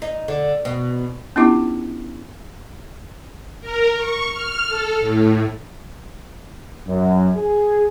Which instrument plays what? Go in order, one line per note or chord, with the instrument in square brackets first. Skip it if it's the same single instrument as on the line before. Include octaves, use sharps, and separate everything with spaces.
[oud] D#4
D3
B2
[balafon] B3 C#4 D4 E4 F4 G4
[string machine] A#4
C#6
F6
A4
A2
[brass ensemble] F#2
G#4